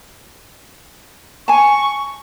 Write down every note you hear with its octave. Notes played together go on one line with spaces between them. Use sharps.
G#5 A5 C#6